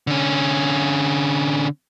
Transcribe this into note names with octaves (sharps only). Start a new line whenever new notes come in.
D3 C#4